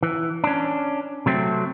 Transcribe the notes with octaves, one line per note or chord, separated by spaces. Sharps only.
E3
C#4 D4
C3 F#3 A3 C4